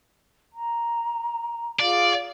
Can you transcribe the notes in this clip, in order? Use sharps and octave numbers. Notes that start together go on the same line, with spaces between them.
A#5
F4 G#4 D5 F5